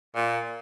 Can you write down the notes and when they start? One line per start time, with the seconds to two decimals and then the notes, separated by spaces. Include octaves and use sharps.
0.16 A#2